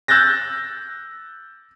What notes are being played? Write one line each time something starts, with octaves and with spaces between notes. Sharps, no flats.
E6 F#6 G6 A6 A#6